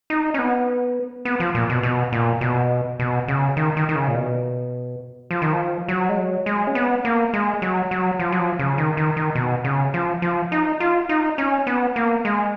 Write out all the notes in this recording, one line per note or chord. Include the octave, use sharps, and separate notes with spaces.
D#4
C#4
B3
B3
F3
A#2
B2
B2
A#2
B2
B2
C#3
D#3
D#3
D#3
C#3
A#2
B2
F3
D#3
F3
F#3
G#3
F#3
G#3
C#4
B3
A#3
G#3
F#3
F#3
F3
F#3
F3
C#3
D#3
D#3
D#3
B2
C#3
F3
F3
D#4
F4
D#4
C#4
B3
A#3
G#3